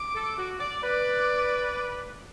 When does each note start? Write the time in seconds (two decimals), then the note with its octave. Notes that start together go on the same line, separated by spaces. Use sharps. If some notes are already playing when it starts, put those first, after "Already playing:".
Already playing: D6
0.15 A4
0.38 F#4
0.60 D5
0.83 B4 D5